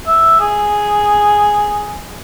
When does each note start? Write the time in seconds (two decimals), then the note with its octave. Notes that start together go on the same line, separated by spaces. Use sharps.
0.07 E5
0.40 G#4